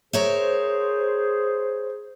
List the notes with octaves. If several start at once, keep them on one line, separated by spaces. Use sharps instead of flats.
G#4 A#4 C5 C#5 E5